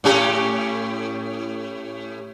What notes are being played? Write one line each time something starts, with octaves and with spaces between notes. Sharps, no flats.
A2 C#4 G4